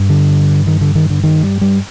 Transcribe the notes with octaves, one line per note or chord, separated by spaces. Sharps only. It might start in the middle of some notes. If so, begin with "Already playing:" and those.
Already playing: G2
D3
D#3
D3
D#3
D3
D#3
G3
G3